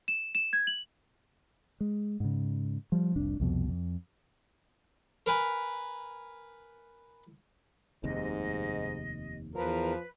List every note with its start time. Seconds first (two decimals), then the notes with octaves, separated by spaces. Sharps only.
0.08 E7
0.35 E7
0.53 G#6
0.67 F#7
1.81 G#3
2.20 G#2 C#3
2.92 F3 G3
3.16 F1 C2 D4
3.40 C2 F2 B2
3.69 F2
5.26 A#4 B4 G#5
8.04 F1 D#2 G#2 C3 D#5
9.55 E2 F3 A#4 B4